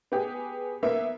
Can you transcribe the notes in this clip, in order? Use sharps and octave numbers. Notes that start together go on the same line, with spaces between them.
B3 G4 G#4
A#3 B3 E5